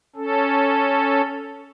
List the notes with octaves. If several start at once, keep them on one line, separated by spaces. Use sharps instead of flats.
C#4 A4